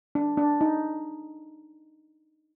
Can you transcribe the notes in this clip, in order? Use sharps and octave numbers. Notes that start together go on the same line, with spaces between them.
D4
D4
D#4